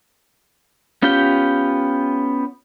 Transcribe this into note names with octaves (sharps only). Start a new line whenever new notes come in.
B3 C#4 F4 G4 G5